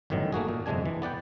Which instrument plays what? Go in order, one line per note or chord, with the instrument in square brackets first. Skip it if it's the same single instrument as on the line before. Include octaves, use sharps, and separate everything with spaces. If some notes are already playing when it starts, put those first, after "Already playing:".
[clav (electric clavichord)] G1 F#2 A2 D#3 E3 F#3
A3 A#3 F#4 G#4
A#2
G1 F2 C3 G#3 D4 G#5
E3
B3 D5 F#5 G5